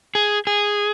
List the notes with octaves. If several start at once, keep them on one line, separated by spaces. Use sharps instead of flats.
G#4
G#4